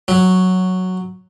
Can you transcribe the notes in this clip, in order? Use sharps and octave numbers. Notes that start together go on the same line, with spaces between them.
F#3